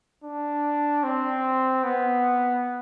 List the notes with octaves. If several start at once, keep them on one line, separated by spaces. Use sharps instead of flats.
D4
C4
B3